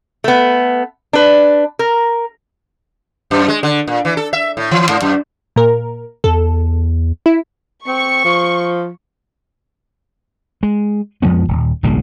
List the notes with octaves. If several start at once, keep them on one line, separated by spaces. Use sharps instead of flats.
A3 B3
D4 B4
A#4
F#2
G#3
D3
A#2
E3
A4
E5
A2
E3
G#2
F#2
A#2 A#4
E2 A4
E4
C4 C#6
F3
G#3
F2 F3 G#3 B3
D#1
D1 B1 A#2 G#3